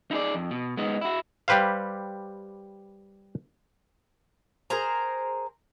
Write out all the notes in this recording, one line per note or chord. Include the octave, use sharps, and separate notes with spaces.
D#4 E4 G4 G#4 D5
F2
B2
G#3 B3 D#4
E4 F#4
G3 G4 B4 C5 F5
G#4 A#4 C5 A#5